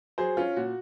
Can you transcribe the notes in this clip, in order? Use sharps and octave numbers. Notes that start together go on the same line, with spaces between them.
F#3 G#4 C5
C#4 F4
A#2 F#4